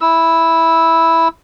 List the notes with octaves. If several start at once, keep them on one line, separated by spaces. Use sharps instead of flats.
E4 E6